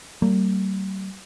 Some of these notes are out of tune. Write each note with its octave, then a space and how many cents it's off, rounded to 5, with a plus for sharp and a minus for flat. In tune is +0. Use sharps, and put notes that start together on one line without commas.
G3 -40 A#3 -40